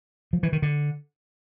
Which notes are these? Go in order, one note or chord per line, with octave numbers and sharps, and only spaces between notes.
F3
E3
D#3
D3